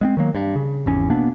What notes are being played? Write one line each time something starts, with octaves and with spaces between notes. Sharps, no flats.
G#3 B3 C4
D#3 F#3 A#3
G2
C#3
G#1 E2 C#4
B2 A#3 B3 D4